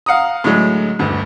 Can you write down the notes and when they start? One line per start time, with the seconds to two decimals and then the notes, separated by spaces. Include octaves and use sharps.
0.06 F5 F#5 A#5 D#6
0.44 A2 D3 F#3 G#3
0.99 G1 D2 G2